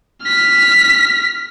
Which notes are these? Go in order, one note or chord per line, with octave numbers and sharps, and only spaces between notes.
F6 B6